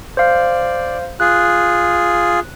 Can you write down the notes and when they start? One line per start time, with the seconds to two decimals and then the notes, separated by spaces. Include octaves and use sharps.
0.17 C5 D5 F5
1.20 F4 G#4 F#6